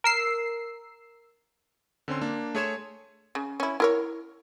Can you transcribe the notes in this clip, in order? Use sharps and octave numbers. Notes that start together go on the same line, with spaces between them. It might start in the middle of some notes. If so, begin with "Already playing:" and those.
A#4 E6 C7
D3 C4 C#4 C6
A#3 D4
A3 G#4 C#5 C6 G#6 E7
C#3
C#4 E4
E4 A#4 C#5